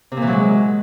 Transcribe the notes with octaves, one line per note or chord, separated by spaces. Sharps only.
C3
A#2
E3
F#3
G#3